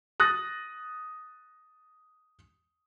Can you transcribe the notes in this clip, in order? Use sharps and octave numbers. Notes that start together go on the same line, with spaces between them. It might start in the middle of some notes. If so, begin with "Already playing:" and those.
D#6 F#6 A6 A#6